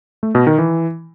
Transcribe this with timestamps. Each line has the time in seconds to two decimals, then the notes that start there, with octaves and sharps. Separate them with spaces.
0.23 A3
0.35 B2
0.47 D#3
0.58 E3